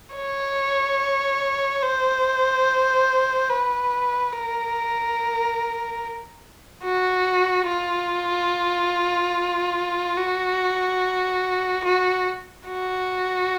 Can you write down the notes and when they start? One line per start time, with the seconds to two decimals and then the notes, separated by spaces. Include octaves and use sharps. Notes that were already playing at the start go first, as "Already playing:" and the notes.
0.16 C#5
1.83 C5
3.50 B4
4.33 A#4
6.84 F#4
7.68 F4
10.18 F#4
11.85 F#4
12.68 F#4